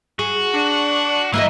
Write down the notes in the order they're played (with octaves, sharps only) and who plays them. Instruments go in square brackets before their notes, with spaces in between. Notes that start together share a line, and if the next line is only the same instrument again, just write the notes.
[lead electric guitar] F#4 [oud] G#4
[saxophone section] D4
[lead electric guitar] E3 [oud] A#3 E4 D#5